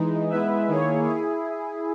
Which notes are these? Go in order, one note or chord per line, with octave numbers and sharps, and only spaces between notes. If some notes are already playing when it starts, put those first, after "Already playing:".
Already playing: E3 G#3 D#4
G#3 B3 E4 B4 E5
D#3 A#3 E4 G#4 C#5
E4 G#4